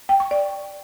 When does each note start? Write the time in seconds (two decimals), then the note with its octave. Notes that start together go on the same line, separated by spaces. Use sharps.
0.09 G5
0.20 C#6
0.31 D5